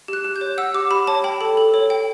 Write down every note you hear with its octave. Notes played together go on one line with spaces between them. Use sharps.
G4 F#6
G4
G6
C#5
F#5 E6
G4 D6
G4 B5
C#5 A5
G5 B5
A4
A4
C#5
G5